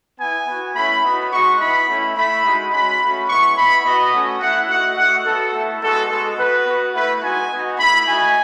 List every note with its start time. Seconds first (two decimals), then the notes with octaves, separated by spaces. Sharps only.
0.19 B3 E4 G#5
0.47 B3 F#4
0.75 A3 C#4 E4 B5
1.03 B3 D#4 F#4
1.32 G#3 D#4 F#4 C#6
1.59 B3 E4 B5
1.88 A3 C#4 E4
2.16 A3 E4 B5
2.44 G#3 D#4 F#4
2.72 G#3 C#4 F#4 B5
3.01 A3 C#4 F#4
3.29 G#3 B3 E4 C#6
3.57 B3 E4 B5
3.85 B3 F#4 D#5
4.13 A3 C#4 F#4
4.41 A3 E4 F#5
4.69 A3 D#4 F#4 F#5
4.97 A3 D#4 F#4 F#5
5.25 B3 F#4 A4
5.53 A3 E4
5.82 G#3 B3 D#4 F#4 A4
6.10 G#3 B3 F#4 A4
6.38 B3 F#4 B4
6.66 B3 F#4
6.94 A3 E4 B4
7.22 G#3 B3 D#4 F#4 G#5
7.51 B3 D#4 F#4
7.79 A3 E4 B5
8.07 A3 D#4 F#4 G#5